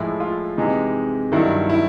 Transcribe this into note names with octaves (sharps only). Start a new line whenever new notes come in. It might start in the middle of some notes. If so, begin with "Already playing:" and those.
Already playing: A2 F3 G#3 E4
F4
C3 E3 G#3 D#4
G2 D#3 F#3 E4
E4